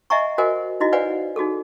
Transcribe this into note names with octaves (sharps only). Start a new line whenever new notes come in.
D#5 E5 F#5 G#5 A#5 C#6
F#4 A#4 C5 D#5 F#5 G#5
D#4 E4 F#4 D#5
B4 C5 D5 F5 F#5 G#5
D#4 F#4 G#4 A4